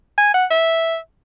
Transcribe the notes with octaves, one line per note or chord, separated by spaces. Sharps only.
G#5
F#5
E5